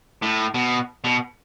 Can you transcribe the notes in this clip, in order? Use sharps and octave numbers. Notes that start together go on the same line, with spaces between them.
A2
B2
B2